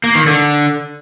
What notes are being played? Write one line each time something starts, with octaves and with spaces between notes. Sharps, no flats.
A#3
D#3
D3